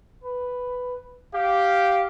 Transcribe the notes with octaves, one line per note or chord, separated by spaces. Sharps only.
B4
G4 F5